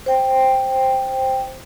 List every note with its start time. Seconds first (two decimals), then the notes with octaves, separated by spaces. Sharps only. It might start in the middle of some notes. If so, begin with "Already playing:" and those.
0.06 C5 G5